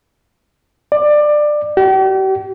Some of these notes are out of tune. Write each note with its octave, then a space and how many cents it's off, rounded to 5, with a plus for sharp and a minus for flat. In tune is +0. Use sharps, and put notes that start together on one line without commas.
D5 +20
G4 -45